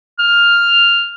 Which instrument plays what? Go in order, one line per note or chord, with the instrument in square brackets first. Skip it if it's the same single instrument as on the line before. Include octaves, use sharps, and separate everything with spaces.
[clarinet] F6